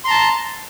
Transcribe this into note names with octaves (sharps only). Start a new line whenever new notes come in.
A5 A#5 C6